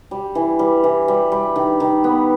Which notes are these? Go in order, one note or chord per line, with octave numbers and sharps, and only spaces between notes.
G3
E3
G3
E3
G3
G3
D#3
D#3
B3